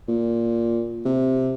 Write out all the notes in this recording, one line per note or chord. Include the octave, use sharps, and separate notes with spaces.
A#2
C3